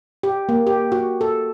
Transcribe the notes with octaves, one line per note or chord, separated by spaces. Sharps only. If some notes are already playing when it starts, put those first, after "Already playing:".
G4
A#3
G4
F#4
A4